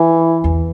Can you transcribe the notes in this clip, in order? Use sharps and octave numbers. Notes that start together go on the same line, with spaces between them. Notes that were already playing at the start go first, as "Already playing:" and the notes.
Already playing: E3
E2